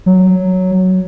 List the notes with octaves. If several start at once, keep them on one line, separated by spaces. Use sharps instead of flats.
F#3